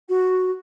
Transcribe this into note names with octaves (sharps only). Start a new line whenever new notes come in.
F#4